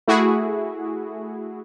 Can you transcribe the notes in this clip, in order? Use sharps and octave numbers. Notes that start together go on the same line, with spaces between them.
A3 E4 F#4 G#4